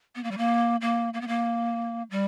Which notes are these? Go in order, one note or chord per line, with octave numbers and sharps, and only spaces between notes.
B3
A#3
G3
A#3
A#3
A#3
B3
A#3
G3